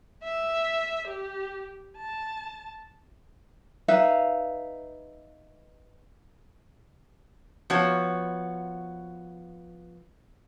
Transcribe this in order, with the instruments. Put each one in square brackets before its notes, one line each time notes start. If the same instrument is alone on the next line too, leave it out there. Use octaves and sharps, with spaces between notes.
[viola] E5
G4
A5
[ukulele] D#4 B4 E5 F5
[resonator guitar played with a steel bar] F3 B3 F#4 C#5